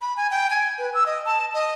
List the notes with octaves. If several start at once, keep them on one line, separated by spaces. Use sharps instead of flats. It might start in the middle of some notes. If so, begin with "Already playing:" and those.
B5
G#5
G5
G#5
B4
E6
D#5
A5
D#5